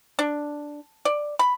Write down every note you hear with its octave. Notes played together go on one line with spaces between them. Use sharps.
D4
D5
B5